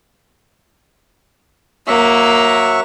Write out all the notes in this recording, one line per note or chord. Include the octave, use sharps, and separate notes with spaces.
F#3 A#3 E5 C#6